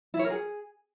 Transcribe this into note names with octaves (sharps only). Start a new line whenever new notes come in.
E4
C#5
A#4
G#4